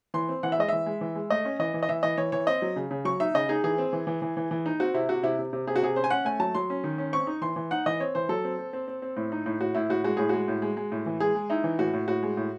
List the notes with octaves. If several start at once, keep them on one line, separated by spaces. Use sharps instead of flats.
E3 C6
C4
E3 F#5
E5
G#3 D#5
E3 E5
G#3
E3
G#3
A3 D#5
C#4
E3 D#5
E3
D#5
E3 E5
E3 D#5
E3 C#5
E3 C#5
C4 D#5
F#3
C#3
C#3
F#3 C#6
D#4 E5
C#3 D#5
D#4 G#4
E3 G#4
C4
E3
E3
E3
E3
E3
D#4
C4 F#4
C3 E4
C3 F#4
C3 E4
C3
C3
C3 G#4
F#4
C3 G#4
C#4 C5
G#5
C#4 F#5
A3 G#5
F#3 A5
F#3 C6
C#4
D#3
C#4
C4 C#6
D#4
E3 C6
E3
D#4 F#5
E3 D#5
C4 C#5
E3 C5
F#3 A4
C4
C4
C4
C4
C4
A2
D#4
A2
A2 F#4
A2 E4
A2 F#4
G#3 F#4
A2 G#4
G#3 F#4
A2
G#3
G#3
A2
E3
G#3 G#4
G#3
D#4 E4
E3
A2 F#4
A2
A2 F#4
G#3
A2